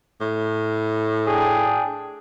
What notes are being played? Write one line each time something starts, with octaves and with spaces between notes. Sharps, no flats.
A2
D4 G#4 G5